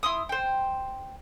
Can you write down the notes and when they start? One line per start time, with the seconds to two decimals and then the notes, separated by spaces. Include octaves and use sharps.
0.03 E4 C6 D#6
0.29 C5 G5